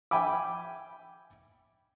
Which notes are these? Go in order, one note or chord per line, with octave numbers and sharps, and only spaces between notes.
E5 G5 G#5 B5 D6